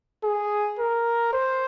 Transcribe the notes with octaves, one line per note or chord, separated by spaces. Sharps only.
G#4
A#4
C5